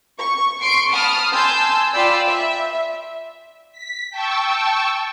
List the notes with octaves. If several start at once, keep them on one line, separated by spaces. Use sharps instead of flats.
C#6
C6 C#6 C7 D7
A5 B5 D#6 F6
G#5 A5 C6 E6 G6
F4 D5 G5 B5 E6
E5
B6
G5 A5 C#6 E6